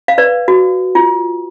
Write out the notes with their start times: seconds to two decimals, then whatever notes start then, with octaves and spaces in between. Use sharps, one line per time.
0.08 F5
0.18 B4 D5
0.48 F#4
0.95 F4